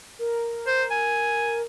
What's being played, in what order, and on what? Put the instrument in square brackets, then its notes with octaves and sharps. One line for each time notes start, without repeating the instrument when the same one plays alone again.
[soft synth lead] A#4
[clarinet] C5
G#5